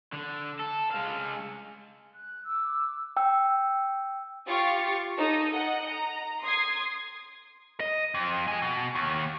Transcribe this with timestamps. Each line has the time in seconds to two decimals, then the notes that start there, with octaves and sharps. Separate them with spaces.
0.13 D3
0.59 A4
0.91 G#3 F5
2.15 F#6
2.44 D6 E6
3.17 G5 E6
4.47 F4 G4 F5 C#6 A6
5.17 D#4 A4
5.52 D#5 F#5
5.91 A#5
6.42 C6 D#6 G#6 C7
7.80 D#5
8.15 F2
8.48 D#5 G#5
8.62 B2
8.95 D#2